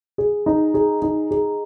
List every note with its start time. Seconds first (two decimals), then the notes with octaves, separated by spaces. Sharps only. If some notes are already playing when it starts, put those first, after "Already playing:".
0.18 G#4
0.46 D#4
0.74 G#4
1.02 D#4
1.31 G#4